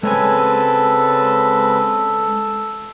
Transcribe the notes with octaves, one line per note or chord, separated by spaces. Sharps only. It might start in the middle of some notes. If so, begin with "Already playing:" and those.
C#3 G#3 C4 A4 B4 C#5 G#5